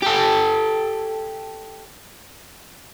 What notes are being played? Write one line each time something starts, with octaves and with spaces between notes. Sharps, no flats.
G4 A4